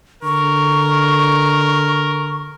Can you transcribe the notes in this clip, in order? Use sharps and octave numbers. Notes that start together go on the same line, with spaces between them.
D3 A#4 C#6